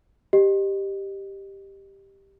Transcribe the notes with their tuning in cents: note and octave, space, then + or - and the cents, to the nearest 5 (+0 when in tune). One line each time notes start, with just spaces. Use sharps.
G4 +0 D#5 -25